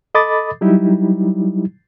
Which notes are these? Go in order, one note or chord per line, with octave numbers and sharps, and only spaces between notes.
A4 D#5 B5 D6 D#6 A6
F#3 G3 D#4 E4 G4